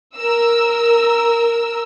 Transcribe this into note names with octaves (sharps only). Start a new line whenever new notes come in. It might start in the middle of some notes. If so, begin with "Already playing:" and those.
A#4 E6